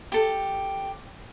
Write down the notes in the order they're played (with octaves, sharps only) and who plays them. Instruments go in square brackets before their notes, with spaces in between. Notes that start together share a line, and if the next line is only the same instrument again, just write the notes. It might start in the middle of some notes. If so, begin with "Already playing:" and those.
[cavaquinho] G4 A4